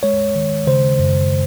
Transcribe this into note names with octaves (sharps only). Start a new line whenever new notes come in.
G#3 C#5
D#3
C#3 C5
F#2